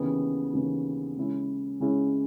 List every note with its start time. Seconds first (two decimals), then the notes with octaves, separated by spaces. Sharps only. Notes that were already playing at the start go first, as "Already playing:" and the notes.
Already playing: D#2 C#3 E3 B3
0.53 D#2 C#3 E3 B3
1.17 C#3 G#3 C#4 E4
1.80 C#3 G#3 C#4 E4